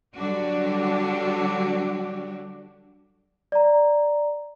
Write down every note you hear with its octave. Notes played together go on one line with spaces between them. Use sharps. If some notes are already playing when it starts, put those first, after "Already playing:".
D3 F#3 G3 D4 F#4 G4
D5 A#5